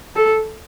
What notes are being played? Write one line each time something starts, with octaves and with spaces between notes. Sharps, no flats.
A4